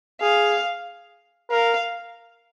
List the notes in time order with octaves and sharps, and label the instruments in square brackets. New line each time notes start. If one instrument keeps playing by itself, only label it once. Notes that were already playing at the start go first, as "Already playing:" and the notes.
[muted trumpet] G#4 [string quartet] F5
[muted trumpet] A#4 [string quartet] F5